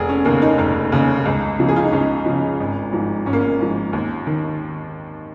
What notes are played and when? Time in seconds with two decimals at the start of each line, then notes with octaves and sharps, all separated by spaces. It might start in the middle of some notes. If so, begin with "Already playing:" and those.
Already playing: F1 G#4
0.09 C#4
0.25 D#2 C#3 A#3
0.42 D#4
0.58 F1 D#4
0.92 D#2 C#3
1.25 C#2
1.59 C#3 F3
1.68 G#4
1.76 F4
1.84 D#4
1.92 C#2 C#4
2.26 C#3 F3
2.60 G#1
2.93 G#2 F3
3.26 G#1 C#4
3.33 A#3
3.41 C#4
3.60 G#2 F3
3.93 D#2
4.27 D#3